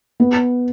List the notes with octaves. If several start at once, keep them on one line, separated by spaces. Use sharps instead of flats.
B3